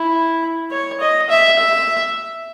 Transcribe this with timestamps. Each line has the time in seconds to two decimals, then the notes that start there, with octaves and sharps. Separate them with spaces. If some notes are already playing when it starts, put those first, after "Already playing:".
Already playing: E4
0.71 C#5
1.01 D#5
1.30 E5
1.59 E5